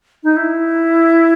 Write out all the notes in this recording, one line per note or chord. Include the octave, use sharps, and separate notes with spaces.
D#4
E4